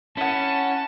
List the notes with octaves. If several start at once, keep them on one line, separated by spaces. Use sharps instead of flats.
C#4 E4 F#5 A5